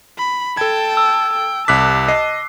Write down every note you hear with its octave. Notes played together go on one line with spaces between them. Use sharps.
B5
A4 G5 A5 G#6
E6
G5
C2 A5 D6 F#6 B6
D#5 C7